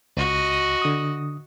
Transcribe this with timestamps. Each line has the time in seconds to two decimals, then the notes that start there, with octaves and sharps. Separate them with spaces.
0.17 C#2 F#4 D#5
0.82 D3 D#6